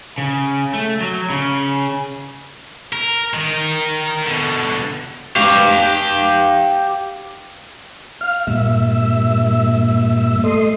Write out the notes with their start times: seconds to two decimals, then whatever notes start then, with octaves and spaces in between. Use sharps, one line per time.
0.18 C#3
0.73 A3
1.01 F#3
1.30 C#3
2.93 A#4
3.34 D#3 A#4
4.26 B2 D3
5.36 G4 F5
8.21 F5
8.47 G2 A#2 E5
10.44 A3 D#5 C6